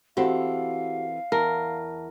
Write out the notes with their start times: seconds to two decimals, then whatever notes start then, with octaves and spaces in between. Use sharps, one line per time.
0.17 E3 C4 F#4 G4 A4 F5 F#5
1.32 E2 A#4 A5